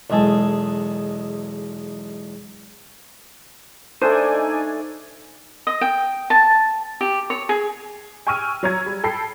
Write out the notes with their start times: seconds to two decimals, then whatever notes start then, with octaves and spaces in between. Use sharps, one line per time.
0.10 B1 E2 G#3 G#4 A4
4.01 A3 D4 D#4 C5 D5 G#5 D#6
5.67 D#5
5.81 G5
6.30 A5
7.01 G4
7.30 C#5
7.49 G#4
8.27 G5 G#5 C#6 E6 F6 D#7
8.63 F#3 C#5 A#5 G#6
8.86 G3
9.04 A4 G5 B5 C7